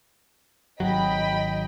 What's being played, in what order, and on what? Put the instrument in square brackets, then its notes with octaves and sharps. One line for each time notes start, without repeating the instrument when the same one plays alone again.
[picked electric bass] G#1 F#3 [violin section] D#5 G5 B5